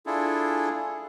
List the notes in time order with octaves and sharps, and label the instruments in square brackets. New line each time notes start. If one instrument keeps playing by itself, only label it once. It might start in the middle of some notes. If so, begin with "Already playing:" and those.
[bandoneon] D4 E4 F4 G#4 A4